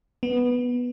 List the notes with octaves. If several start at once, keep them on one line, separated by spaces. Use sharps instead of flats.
B3